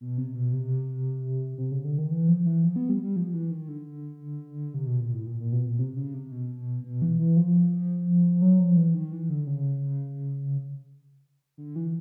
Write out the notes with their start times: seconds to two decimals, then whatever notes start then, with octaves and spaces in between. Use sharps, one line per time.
0.01 B2
0.18 C3
0.35 B2
0.53 C3
1.58 C3
1.72 C#3
1.84 D3
1.98 D#3
2.11 E3
2.28 F3
2.46 E3
2.64 F3
2.76 B3
2.89 G3
3.03 G3
3.16 F3
3.34 E3
3.51 D#3
3.68 D3
4.74 C3
4.87 B2
5.00 A#2
5.13 A2
5.26 A#2
5.40 A#2
5.52 B2
5.66 A#2
5.79 C3
5.96 C#3
6.14 C3
6.32 B2
6.84 B2
7.02 E3
7.19 E3
7.37 F3
8.42 F#3
8.60 F3
8.77 E3
8.94 D#3
9.13 E3
9.30 D3
9.47 C#3
11.58 D3
11.76 E3